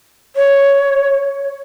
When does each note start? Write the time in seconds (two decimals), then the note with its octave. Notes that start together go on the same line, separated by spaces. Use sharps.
0.36 C#5